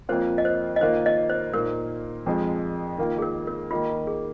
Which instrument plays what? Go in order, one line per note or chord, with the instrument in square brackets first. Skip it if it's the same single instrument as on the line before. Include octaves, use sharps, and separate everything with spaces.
[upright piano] F2 F3 A#3 F4 [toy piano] C5
[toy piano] D#5
C5
D#5
[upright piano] D#3 A#3 F4 [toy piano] C5
[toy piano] D#5
C5
[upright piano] A#2 A#3 D#4 [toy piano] A#4
[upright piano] F2 F3 G#3
D#3 A#3 F4
[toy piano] G#4
A#4
A#4
[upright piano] D#3 A#3 D#4 [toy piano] F4
[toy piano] G#4